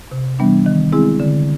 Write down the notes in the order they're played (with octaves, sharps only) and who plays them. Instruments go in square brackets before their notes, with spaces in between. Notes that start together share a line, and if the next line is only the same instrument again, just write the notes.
[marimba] C3
E3 G3 B3 D4
D#3
G#3 C4 E4 G#4
D3